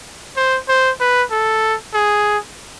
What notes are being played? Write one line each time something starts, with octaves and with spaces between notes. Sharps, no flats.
C5
C5
B4
A4
G#4